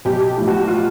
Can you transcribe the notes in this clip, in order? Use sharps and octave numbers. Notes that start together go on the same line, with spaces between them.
B1 G4
A2 F3
F#4
F4